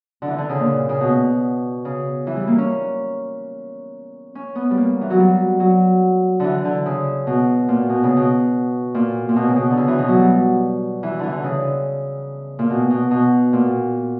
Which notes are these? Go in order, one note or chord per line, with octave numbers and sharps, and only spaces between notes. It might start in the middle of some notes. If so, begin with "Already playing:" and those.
D3
E3
D3
C#3
A#2
C#3
B2
C#3
E3
G3
A#3
C#4
C#4
B3
G3
A#3
E3
F#3
G3
F#3
D3 E3
D3
C#3
B2
A#2
B2
C#3
B2
A#2
A#2
B2
C#3
B2
D3
C#3
E3
B2
F#3
G3
E3
D3 E3
D3
C#3
A#2
B2
B2
B2
A#2